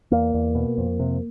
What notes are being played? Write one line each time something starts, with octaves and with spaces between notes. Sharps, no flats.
E2 A#3
E2
B2
F2
C3